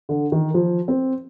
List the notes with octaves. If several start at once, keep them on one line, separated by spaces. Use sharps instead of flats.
D3
D#3
F3
C4